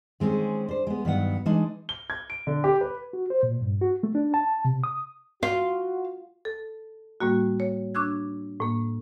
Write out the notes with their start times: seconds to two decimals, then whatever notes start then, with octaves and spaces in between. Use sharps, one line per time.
0.20 D#3 G#3 C4 C#4 G#4
0.68 D4 C5
0.87 G#3 B3
1.05 G2 D#3 F#3 B3 F#5
1.46 E3 G#3 D4 D#4
1.89 G7
2.10 G#6
2.30 D7
2.47 D3
2.64 G4
2.81 B4
3.13 F#4
3.30 C5
3.43 A#2
3.61 G2
3.81 F#4
4.03 A3
4.15 D4
4.34 A5
4.65 C3
4.84 D#6
5.43 F4 F#4 F5
6.45 A4
7.20 A2 G3 A#3 F#4
7.60 C#5
7.94 D4 C#6 D6 E6 F#6 G#6
8.60 A2 A#3